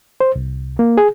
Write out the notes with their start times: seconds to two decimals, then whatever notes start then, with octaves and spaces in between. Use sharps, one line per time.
0.20 C5
0.35 C2
0.79 A#3
0.98 G#4